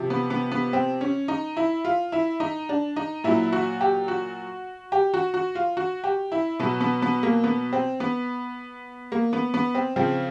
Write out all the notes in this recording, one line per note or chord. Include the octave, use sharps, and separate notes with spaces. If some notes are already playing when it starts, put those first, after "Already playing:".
Already playing: C3 F3
B3
B3
B3
C4
C#4
D#4
E4
F4
E4
D#4
D4
D#4
A#2 F#3 E4
F#4
G4
F#4
G4
F#4
F#4
F4
F#4
G4
E4
B2 F#3 B3
B3
B3
A#3
B3
C4
B3
A#3
B3
B3
C4
C#3 F3 C4